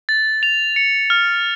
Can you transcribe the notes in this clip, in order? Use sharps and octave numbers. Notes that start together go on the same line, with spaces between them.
A6
F7
C#7
F6